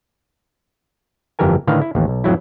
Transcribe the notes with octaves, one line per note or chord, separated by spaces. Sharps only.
G1 F2 E3 G4 A#4 G#5
A2 D3 D#3 B4 F5
E4
A1 D#2
B1
F2 A2 F#3 E4